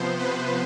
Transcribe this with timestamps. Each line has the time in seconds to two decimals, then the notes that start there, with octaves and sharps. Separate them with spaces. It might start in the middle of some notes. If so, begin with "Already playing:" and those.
Already playing: C3 F3 B3 C5
0.19 B4